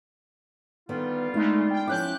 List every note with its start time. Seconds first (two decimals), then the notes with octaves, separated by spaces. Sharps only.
0.89 D3 D#3 G3 B3 F4
1.34 G#3 A3 D4 D#4
1.71 G5
1.87 F3 C#4 E4 D6 F#6 G6